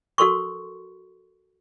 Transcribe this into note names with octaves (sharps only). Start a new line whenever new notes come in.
F#4 A4 A#4 C6 C#6